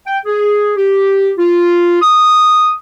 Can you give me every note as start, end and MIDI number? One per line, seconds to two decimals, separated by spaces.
0.06 0.19 79
0.26 0.72 68
0.77 1.31 67
1.38 1.98 65
2.02 2.73 87